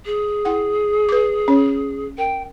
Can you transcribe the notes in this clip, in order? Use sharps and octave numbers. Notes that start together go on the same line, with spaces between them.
G#4
E4 F#5 G5
B4 D6
C#4 C#5
A#4 G5